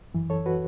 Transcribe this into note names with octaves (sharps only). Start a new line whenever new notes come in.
F#2 E3
A4 C#5
F#4 B4